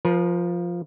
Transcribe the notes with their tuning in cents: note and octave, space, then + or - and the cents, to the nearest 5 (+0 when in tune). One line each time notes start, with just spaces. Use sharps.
F3 +0 A#4 +45